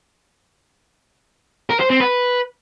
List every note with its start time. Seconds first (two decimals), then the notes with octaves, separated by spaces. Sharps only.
1.70 A#4
1.80 C5
1.90 C4
2.00 B4